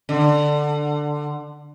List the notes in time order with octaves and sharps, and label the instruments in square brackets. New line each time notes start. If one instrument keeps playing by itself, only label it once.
[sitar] D3